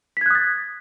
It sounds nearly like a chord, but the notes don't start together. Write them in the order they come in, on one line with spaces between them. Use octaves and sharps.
B6 G#6 F#6 D#6 A6